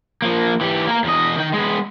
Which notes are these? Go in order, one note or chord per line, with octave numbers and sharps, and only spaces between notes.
F3 A#3
E3 G4
A#3 A#4
E2 D#5
D#3 G5
G#3 B3